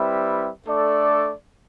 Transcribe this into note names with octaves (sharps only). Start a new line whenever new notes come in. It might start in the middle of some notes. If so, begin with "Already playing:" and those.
Already playing: G3 C4 E4 B4 E5
A3 D4 A4 D5